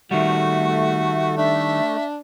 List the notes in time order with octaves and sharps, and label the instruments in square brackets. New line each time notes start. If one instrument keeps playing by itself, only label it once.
[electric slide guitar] D#3 G3 [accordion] A3 [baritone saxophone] F#4
[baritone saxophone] D4 [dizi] E5